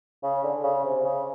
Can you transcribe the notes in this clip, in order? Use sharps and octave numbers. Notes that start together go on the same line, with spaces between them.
C#3
D3
C#3
C3
C#3